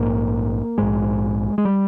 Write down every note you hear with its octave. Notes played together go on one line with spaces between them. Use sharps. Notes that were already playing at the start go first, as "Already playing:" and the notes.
Already playing: A#1 G#2 A#3
A#1 G#2 G#3
G#3
G3